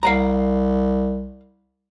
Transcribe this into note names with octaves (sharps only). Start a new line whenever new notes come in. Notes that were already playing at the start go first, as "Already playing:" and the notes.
C2 F5 F#5 A#5